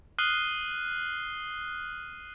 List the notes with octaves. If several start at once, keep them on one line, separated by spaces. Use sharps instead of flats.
D#6 F6 F#6 C7 D#7 G7